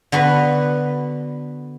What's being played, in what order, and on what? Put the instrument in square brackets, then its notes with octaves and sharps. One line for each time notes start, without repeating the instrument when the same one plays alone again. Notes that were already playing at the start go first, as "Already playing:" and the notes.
[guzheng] D3 B3 F#4 B4